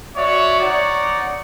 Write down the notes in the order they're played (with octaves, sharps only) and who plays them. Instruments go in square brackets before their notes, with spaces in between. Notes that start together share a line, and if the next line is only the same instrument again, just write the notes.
[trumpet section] F#4 C#5 D5 E5
D#4 C#5 D5 F#5